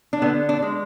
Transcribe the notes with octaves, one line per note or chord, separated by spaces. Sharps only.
D4
D3 B3
D4
G#3